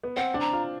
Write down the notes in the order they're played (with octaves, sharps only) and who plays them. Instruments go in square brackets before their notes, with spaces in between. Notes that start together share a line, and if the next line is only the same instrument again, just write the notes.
[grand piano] B3
[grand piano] C4 [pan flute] F#5
[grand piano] D4
[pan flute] A#5
[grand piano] F4